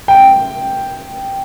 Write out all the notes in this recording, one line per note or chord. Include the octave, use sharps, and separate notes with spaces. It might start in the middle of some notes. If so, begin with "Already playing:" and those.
G5